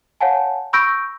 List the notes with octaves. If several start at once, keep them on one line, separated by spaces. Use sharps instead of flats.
C#5 F5 F#5 G#5 A5
B5 C#6 E6 G6 A#6 D7